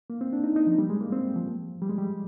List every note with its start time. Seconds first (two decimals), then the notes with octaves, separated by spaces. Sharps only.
0.10 A#3
0.21 C4
0.33 D4
0.44 D#4
0.56 D#4
0.67 F3
0.79 G3
0.90 G#3
1.01 A#3
1.12 C4
1.36 F3
1.82 G3
1.89 G#3
1.98 G3